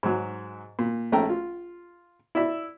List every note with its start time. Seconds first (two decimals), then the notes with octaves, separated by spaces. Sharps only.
0.03 G#2 F#3
0.79 A#2
1.12 A#1 A3 C#4 G5 A#5
1.30 F4
2.35 E4 D5 E5 E6